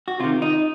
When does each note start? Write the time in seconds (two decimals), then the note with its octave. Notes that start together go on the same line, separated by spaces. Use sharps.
0.08 F#4
0.20 C3 D#3 F4
0.42 D#4